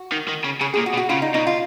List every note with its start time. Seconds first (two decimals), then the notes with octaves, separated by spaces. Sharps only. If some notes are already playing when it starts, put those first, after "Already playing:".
Already playing: F#4
0.12 D#3
0.29 D#3
0.45 C#3
0.61 C#3 G#4
0.74 A#2 G#4
0.86 F#4
0.93 B2
0.97 F#4
1.09 C#3 F4
1.22 D#4
1.34 B2 D#4
1.47 F4